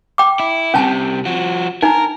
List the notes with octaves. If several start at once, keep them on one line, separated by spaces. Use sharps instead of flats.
G5 D6
E4
C2 C3 C#4 G#5 A5
F3 F#4
D4 D#4 A#4 A#5